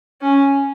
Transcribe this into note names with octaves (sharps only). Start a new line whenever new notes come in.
C#4